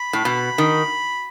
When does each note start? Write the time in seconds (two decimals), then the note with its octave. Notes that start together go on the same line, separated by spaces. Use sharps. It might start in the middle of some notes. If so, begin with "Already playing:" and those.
Already playing: B5
0.13 A2
0.25 B2
0.58 D#3